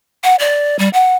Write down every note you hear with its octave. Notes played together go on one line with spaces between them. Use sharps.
F#5
D5
G3
F#5